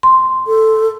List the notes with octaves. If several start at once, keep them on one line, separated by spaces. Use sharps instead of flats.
C6
A4